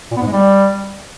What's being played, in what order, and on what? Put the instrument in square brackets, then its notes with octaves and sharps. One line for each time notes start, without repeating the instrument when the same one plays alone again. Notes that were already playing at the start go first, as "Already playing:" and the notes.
[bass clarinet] A#2
B3
G#2
G#3
G3